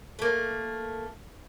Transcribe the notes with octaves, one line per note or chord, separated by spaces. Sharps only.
A3 A#3